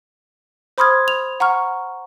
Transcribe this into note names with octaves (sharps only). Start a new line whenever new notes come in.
C5 B5 C6 D#6 F6 G#6
F7
F#5 A#5 C#6 F6